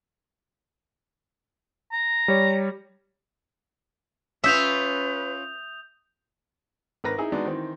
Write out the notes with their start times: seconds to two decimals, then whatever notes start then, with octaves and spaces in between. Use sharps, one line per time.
1.92 A#5
2.28 G3 C#5
4.44 C#4 F4 B4 E5 D#6 G6 F7
7.04 G#1 A#4 B4 A#6
7.18 D#4 E4 G#4
7.32 G#3 B3 D4 D#4 F#4
7.46 D#3 E3 C4